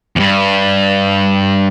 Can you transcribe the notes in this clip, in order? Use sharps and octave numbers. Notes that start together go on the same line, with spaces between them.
E2 G2